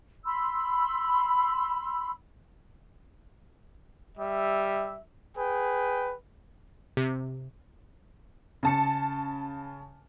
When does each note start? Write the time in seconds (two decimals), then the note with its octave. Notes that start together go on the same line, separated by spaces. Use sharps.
0.25 B5 C6 E6
4.18 G3 E5
5.37 G#4 B4 G5
6.97 C3
8.63 C#3 A5 C#7